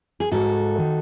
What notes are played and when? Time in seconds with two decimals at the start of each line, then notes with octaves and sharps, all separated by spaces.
0.20 G#4
0.31 G#2 F#4 A4
0.78 D#3